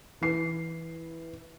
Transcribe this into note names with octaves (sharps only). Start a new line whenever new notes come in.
E3 C7